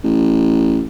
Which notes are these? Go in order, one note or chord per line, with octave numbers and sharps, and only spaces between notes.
A1